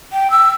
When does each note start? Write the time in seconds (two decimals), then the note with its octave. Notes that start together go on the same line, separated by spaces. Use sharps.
0.12 G5
0.30 E6